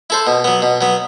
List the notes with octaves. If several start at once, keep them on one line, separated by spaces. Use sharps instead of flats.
E4 A4 C5
B2
F#3 B3
B2
F#3 B3